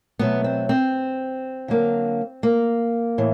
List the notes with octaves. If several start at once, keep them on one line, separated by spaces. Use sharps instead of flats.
B2 F#3 A3 B3
C4
C4
D3 F#3 A#3
A#3
A2 E3